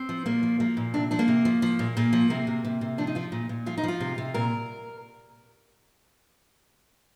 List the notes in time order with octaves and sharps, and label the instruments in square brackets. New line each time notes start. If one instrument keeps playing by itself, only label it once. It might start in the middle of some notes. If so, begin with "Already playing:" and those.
Already playing: [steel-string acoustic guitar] C4
F3
A#2 A#3
F3
F3 A#3
A#2
C3 D4
F3 D4
A#3
C3
F3
F3
A#2
A#2 A#3
F3
C3 A#3
C3
C3
C3
F3 D4
D#4
F3 F4
A#2
A#2
F3 F4
D#4
F3 F4
C3
C3
A#2 A#4